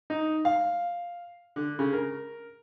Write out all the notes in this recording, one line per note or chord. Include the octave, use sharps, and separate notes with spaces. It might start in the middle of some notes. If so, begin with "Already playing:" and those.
D#4
F5
D3
C#3
A#4